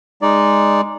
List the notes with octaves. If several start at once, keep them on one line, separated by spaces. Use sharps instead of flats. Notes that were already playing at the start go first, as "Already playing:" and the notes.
G#3 D#4 D5